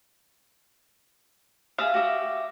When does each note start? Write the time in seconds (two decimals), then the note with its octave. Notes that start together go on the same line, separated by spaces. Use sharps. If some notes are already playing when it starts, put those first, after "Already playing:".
1.78 G#4 E5 F5 D#6
1.94 F#4 G4 E5